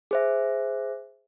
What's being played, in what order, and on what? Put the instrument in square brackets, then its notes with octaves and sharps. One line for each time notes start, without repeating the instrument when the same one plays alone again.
[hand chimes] G#4 C5 E5